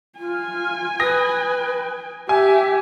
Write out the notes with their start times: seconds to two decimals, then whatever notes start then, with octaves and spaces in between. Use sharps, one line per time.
0.19 F4 G#5
1.00 B4 D#6 A#6
2.29 G4 E5 G#5